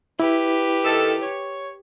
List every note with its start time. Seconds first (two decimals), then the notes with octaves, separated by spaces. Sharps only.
0.20 E4 G4 B4
0.84 D#3 A4
1.21 C#5